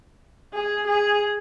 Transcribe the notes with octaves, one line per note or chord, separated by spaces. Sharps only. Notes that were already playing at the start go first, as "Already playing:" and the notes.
G#4
G#4